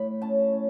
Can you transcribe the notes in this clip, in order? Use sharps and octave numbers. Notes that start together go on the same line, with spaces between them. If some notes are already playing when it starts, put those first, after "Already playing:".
Already playing: A2 A3 B5
C#4 A5
C#4